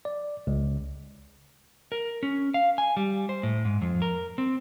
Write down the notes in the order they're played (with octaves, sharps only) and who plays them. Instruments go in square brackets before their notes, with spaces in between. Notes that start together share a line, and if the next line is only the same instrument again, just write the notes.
[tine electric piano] D5
C#2
[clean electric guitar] A#4
C#4
F5
G#5
G3
C5
A2
G#2
F2
A#4
C4